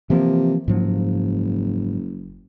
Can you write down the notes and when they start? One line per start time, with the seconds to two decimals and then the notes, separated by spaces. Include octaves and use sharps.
0.10 C3 E3 F3 A#3
0.68 F#1 G#2 F3 F#3